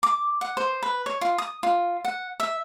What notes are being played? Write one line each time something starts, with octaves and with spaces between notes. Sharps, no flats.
D6
F#5
C5
B4
C#5
F4
D#6
F4
F#5
E5